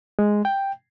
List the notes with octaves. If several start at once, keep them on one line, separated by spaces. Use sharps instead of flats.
G#3
G5